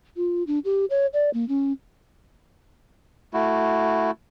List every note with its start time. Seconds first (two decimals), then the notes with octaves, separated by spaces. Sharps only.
0.17 F4
0.47 D4
0.65 G4
0.90 C#5
1.13 D5
1.34 A#3
1.49 C#4
3.34 A3 E4 F#4